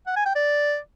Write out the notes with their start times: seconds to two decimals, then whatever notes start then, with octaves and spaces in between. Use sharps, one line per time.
0.07 F#5
0.16 G#5
0.26 G5
0.35 D5